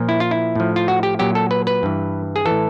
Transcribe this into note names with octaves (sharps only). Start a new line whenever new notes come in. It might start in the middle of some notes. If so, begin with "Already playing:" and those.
Already playing: A#2 F3
E4
F4
E4
A2 F3
F4
F#4
G4
A#2 F#3 G4
A4
B4
B4
G2 E3
G#4
E3 A4
A2